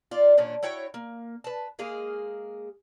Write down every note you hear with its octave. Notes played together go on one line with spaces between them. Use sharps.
F4 D5
A#2 D#3 C#4 D4
E4 F#4 C#5 G5
A#3
B4 A5
G#3 A#3 G#4 F5